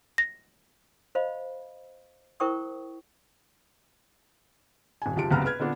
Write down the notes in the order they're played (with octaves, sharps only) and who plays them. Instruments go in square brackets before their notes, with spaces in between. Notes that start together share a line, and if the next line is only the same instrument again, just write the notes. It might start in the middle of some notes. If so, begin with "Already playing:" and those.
[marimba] A#6
[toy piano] C5 D#5 F5 B5
E4 A#4 C5 G5 C#6 D#6
[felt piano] D#1 G#5
F#1 F4 G4 A5 D7
F#1 C#2 C3 B3 A#5 F6
B4 F6 G#6
A#2 D3 B3 D4